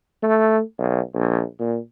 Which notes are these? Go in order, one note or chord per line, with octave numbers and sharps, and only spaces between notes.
A3
B1
A#1
A#2